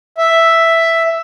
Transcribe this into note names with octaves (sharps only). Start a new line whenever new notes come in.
E5